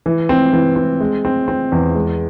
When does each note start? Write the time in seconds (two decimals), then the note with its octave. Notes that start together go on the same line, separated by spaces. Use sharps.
0.06 E3
0.29 C4
0.53 E3
0.76 C4
1.01 G#3
1.25 C4
1.48 C4
1.72 E2
1.95 G#3